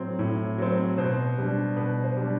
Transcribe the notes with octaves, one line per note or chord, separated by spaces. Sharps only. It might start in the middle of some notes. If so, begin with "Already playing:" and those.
Already playing: A2 F#3 C4
A2
F#3 C4
B2 C5
G3 D4
B2 B4
C5
G3 D4